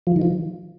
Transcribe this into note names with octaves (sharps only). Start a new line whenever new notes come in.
F3
D#3
F3